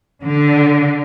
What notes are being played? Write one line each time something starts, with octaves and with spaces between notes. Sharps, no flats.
D3